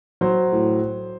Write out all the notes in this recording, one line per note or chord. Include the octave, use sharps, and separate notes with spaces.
F#3 C5
A2